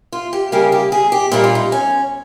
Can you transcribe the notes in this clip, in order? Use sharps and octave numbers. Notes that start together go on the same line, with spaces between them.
F4
G4
C#3 G3 A#3 G4
G4
G#4
G4
A#2 G3 A#3 D#4
F4
D#4
C#4